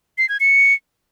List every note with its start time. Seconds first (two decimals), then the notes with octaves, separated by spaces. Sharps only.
0.18 C7
0.29 G#6
0.40 C#7